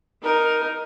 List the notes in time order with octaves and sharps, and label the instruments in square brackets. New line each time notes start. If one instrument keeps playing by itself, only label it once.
[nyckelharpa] D#4 A#4